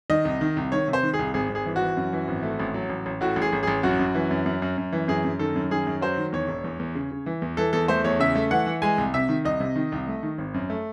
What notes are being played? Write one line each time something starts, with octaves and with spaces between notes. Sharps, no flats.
D#3 D#5
C2
D#3
C2
D#3 C#5
C3
C5
D#3
G#4
C2
G#1 G#4
G#1
G#4
E3
F#4
E3
F#2
E3
G#1
A3
A1
F#3
A1
A1
A2 F#4
A1
G#4
A1
A1 G#4
F#2 F#4
F#2
E3
F#2
F#2
F#2
F#2
E3
F#2 G#4
F#2
D#3 A4
F#2
D#3 G#4
F#2
F#3 C5
D#3
E2 C#5
E1
E2
E2
C#3
C#3
E3
E2
E3 A4
E2 A4
A3 C5
E2 C#5
C#3 E5
A3
E3 F#5
E3
G#3 G#5
C2
C3 E5
D#3
C2 D#5
C3
D#3
C2
A3
D#3
G#1
F#2
A3